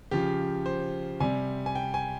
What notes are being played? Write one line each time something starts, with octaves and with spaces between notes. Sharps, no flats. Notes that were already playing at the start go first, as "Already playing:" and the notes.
C#3 F3 G4
C5
C3 G3 G#5
G#5
G5
G#5